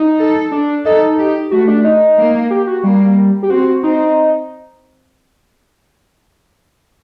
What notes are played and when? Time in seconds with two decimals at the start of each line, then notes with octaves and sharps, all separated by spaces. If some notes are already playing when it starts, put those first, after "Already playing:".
Already playing: D#4
0.19 A4
0.52 D4
0.85 D#4 A4
1.18 G4
1.51 A3 F#4
1.68 D4
1.84 D#4
2.18 A#3
2.50 G4
2.67 F#4
2.84 G3 A#3
3.43 G4
3.49 C4 F#4
3.83 C4 D#4